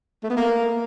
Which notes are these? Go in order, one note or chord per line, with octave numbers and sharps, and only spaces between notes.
A3
B3
A#3